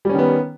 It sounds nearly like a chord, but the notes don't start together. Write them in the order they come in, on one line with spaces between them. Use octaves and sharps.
G3 C#4 D#3 B3